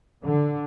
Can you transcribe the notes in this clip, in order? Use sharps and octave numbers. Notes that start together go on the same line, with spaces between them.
D3